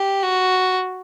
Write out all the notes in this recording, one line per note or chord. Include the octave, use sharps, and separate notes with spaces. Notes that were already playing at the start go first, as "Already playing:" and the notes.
Already playing: G4
F#4